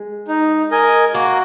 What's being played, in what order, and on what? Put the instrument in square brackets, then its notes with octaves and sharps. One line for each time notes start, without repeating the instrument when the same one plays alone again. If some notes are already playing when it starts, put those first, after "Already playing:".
Already playing: [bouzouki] G#3
[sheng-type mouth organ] D#4
A#4 D#5 G#5
[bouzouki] A#3 [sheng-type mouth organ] F#4